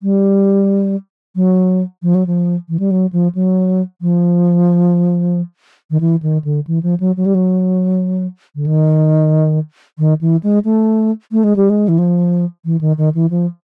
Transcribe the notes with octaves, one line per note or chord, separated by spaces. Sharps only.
G3
F#3
F3
F#3
F3
E3
G3
F#3
F3
F#3
F3
D#3
E3
D#3
D3
E3
F3
F#3
F#3
G3
F#3
D3
D#3
D#3
E3
G#3
A3
A3
G#3
G3
G#3
E3
F3
E3
D#3
D#3
E3
F3